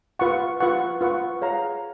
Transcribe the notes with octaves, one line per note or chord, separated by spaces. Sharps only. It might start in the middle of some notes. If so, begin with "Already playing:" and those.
F4 B4 F#5 C#6
F4 B4 F#5 C#6
F4 B4 F#5 C#6
G#4 C#5 F5 A#5